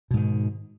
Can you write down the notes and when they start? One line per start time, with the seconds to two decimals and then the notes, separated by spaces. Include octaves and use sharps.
0.11 B2
0.14 G#2
0.17 D#3